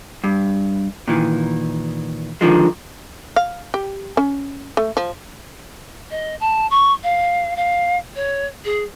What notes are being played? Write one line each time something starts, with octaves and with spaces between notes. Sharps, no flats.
G2
A#2 D#3 E3
D3 D#3 F3 G#3
F5
G4
C#4
A3
F3
D#5
A5
C#6
F5
F5
C#5
G#4